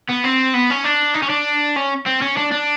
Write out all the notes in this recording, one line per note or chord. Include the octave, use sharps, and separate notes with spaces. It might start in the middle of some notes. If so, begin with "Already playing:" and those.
B3
C4
B3
C#4
D4
D#4
C#4
D4
C#4
C4
C#4
D4
D4